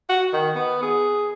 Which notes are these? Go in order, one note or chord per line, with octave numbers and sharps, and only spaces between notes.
F#4
D#3
B3
G#4